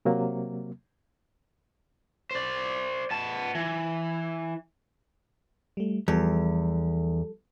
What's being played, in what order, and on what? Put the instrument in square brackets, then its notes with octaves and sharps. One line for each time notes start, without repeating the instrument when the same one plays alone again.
[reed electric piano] C3 F#3 A#3
[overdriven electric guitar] C5 D5
B3 A5
E3
[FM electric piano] G3 A3
[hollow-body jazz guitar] E2 [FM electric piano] F3 G3 A4